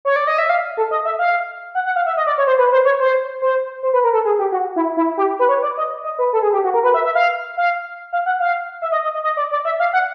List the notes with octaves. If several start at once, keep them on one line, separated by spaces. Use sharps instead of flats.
C#5
D5
D#5
E5
F5
A4
D#5
E5
F5
F#5
F#5
F5
E5
D#5
D5
C#5
C5
B4
C5
C#5
C5
C5
C5
B4
A#4
A4
G#4
G4
F#4
E4
E4
G4
B4
C#5
D5
D#5
D#5
B4
A4
G#4
G4
F#4
A#4
B4
E5
E5
F5
F5
F5
F#5
F5
E5
D#5
D#5
D#5
D#5
D5
D5
E5
F5
F#5